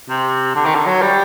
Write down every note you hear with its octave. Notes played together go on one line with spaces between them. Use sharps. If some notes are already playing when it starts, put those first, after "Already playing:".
C3
D3
D#3
D3
F#3
G3